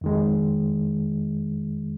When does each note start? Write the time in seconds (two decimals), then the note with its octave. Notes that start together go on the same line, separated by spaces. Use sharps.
0.01 F2 D#3 G#3